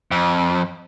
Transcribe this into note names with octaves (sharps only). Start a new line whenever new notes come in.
F2